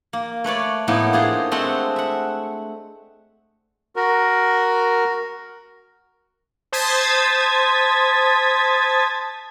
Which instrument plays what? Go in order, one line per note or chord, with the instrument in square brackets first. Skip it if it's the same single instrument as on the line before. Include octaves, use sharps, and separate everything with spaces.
[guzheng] A#3
A3 B4 C#5 D5
A2 A#3 B3 D#4 E4
D4 F4 G#4 C5 A#5
G#3 A3 C4 G#4 E5 F#5
E5 F#5
[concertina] F#4 A#4
[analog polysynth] C5 A5 D#6 G#6 A6 B6